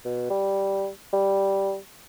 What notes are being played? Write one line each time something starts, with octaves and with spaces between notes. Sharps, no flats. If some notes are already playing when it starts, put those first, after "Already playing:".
B2
G3
G3